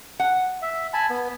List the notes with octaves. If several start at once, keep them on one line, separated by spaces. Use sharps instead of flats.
F#5
E5
G#5 A5 B5
B3